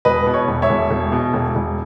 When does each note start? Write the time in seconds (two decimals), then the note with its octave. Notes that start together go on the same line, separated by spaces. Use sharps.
0.05 E1 B4 D#5
0.26 B2
0.34 C#5
0.48 E1
0.62 C#5 E5
0.69 E1
0.90 E1
1.12 B2
1.33 E1
1.55 E1